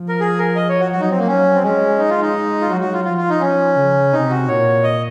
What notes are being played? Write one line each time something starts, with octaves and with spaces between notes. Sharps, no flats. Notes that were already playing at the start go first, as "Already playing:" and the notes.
Already playing: F3
A#4
G#4
A#4
D#5
C#5
F#4
F#3 F#4
D#4
C4
A#3
C#4
C4
G#3 C#4
D#4
F4
D#4
F4
F#3 F#4
F#4
F4
F3 F4
F4
D#4
C#4
C#3
C3 D#4
F#4
A#2 C#5
D#5